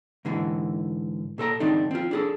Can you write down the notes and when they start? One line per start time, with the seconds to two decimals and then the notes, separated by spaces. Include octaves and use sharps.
0.25 G#2 D3 E3
1.38 A#2 A4 C5 A#5
1.60 D#3 C4 D4 D#4
1.91 C4 F4
2.11 D4 G#4 A4